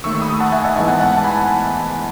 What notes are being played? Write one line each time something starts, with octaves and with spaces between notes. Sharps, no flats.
D#2 D#3 A3 C#6 E6
B5 D#6
F#5 A5
E5 G#5
D#5 F#5
G#2 E3 G#3 B3 E5 G#5
F#5 A5
F#5 A5
F#5 A5
G#5 B5